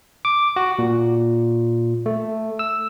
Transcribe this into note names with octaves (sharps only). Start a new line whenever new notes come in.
D6
F#4
A#2
A3
E6